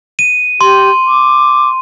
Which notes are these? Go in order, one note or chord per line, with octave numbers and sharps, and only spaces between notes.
D#7
G4 C6
D6